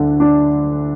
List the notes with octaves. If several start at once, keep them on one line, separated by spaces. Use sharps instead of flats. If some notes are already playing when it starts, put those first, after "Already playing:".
Already playing: D2 D3 D4
D4